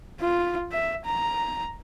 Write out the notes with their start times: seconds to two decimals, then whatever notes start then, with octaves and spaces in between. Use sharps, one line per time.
0.21 F4
0.72 E5
1.05 A#5